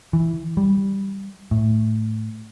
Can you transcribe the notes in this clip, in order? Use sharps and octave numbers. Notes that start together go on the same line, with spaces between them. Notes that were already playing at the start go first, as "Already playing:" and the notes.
E3
G3
A2